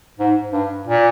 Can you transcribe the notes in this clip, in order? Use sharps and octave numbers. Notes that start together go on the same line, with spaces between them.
G#2
G2
A#2